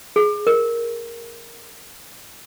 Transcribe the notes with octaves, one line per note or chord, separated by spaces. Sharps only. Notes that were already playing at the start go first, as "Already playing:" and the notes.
G#4
A#4